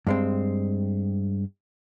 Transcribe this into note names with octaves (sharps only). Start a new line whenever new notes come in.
G2 G#3 C4